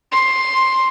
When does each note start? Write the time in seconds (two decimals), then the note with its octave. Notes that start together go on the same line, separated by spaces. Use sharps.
0.11 C6